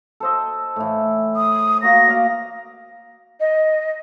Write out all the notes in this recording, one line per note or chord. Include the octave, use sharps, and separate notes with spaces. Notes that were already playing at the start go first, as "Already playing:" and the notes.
A4 C5 D#5
A2 E3
D#6
A#3 F#4 A#6
D5 D#5 F5
D#5